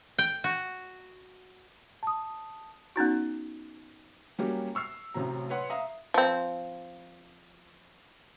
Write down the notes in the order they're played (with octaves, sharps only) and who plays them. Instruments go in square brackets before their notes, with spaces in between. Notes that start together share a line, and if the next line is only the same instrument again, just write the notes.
[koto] G5
F#4
[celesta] A5 D#6
[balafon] B3 C#4 D#4 F#4
[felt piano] F#3 G3 A#3 C#4 F#4 G4
C#6 E6 F6 C7
A1 A2 C3 F#3 A#5
B4 C#5 F#5 C6
E5 F5 A#5 D#6
[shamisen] F3 C4